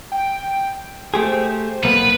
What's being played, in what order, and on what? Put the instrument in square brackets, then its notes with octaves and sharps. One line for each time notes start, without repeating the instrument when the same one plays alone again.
[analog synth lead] G5
[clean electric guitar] A3 G4 G#4 [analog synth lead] C5
[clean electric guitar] B1 A#3 B3 [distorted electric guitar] B4